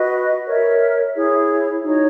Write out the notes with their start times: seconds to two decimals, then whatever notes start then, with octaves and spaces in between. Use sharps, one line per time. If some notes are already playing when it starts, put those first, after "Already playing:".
Already playing: F#4 B4 D#5
0.46 A#4 C#5 E5
1.14 E4 G#4 C#5
1.83 D#4 F#4 C#5